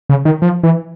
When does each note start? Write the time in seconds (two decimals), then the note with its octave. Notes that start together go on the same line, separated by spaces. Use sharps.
0.09 C#3
0.25 D#3
0.42 F3
0.63 E3